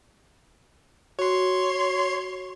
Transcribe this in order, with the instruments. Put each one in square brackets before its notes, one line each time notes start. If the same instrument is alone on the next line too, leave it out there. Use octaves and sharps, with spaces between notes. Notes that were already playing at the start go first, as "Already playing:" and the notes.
[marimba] F#4 [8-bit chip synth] C#5 C6